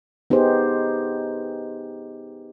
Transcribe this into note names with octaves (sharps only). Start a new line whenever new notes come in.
B3 D#4 G4 G#4 C5